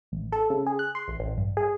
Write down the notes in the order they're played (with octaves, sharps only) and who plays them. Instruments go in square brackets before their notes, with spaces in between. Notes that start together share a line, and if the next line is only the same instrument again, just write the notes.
[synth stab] A1
A4
C#3
G#4
F#6
C6
A1
A1
G2
G#4